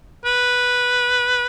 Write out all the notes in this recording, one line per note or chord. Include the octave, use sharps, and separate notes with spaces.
B4